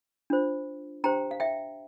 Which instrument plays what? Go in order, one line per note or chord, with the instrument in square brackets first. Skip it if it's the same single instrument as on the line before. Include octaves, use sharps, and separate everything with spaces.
[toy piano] D4 F4 C5
D4 G4 C5 G5 A#5
F5
E5 G5